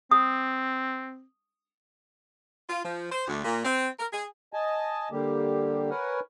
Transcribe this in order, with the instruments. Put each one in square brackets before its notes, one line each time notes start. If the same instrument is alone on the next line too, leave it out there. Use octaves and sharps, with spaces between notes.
[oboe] C4 [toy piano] D#6
[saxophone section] F4
F3
C5
D2
A#2
C4
A#4
G#4
[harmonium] D#5 G#5 A5
D3 G3 A#3 G4
A#4 B4 C#5 F#5 G#5